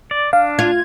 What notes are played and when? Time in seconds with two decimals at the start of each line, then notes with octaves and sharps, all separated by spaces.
0.11 D5
0.33 D4 F5
0.59 F4 G#6